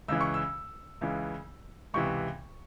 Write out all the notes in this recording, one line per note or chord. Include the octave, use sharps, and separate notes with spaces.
C#2 C#3 E3 E6
C#6
E6
C#2 C#3 E3
C#2 C3 E3 C#6